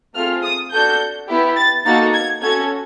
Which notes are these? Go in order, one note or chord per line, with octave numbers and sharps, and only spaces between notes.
A3 C4 F4 G#4 F6
D#6
D4 F#4 A4 G6
B3 E4 G4
A6
A#3 D#4 F#4 A4 A6
G#6
C#4 F#4 A4 G#6